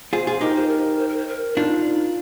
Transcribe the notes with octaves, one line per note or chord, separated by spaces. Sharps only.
F4 G#4 C5
F4 G#4
D#4 G4 A#4
C5
A#4
C5
A#4
C5
A#4
D4 D#4 F4